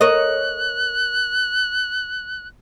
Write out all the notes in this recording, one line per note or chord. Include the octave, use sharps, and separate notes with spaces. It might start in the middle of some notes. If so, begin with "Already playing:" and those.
A#4 C#5 D#5 F#6